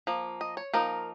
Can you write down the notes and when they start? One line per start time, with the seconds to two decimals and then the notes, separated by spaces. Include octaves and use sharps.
0.07 F3 A#3
0.41 D#5
0.57 C#5
0.73 F3 A#3 D#4 A#4